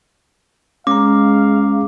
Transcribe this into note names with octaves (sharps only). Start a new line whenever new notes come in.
G#3 C#4 F5 A#5 D6